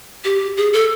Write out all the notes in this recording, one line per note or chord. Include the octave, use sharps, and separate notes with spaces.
G4
G#4
A4